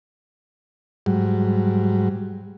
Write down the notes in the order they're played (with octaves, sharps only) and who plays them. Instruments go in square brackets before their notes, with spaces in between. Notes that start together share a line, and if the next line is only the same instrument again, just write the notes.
[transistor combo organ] G#2 F#3 G3